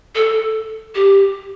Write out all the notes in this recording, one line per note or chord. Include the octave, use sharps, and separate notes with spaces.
A4
G4